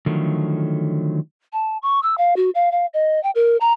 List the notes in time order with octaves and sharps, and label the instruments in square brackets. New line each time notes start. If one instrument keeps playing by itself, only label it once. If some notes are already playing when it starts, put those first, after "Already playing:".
[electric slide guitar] D3 D#3 F3 F#3 A3
[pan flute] A5
C#6
E6
F5
F#4
F5
F5
D#5
G5
A#4
A#5